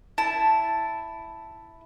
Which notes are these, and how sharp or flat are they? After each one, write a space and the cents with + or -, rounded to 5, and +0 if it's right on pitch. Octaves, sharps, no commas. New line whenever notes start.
E4 +0 A5 +0